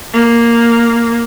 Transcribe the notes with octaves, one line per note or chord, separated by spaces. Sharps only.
A#3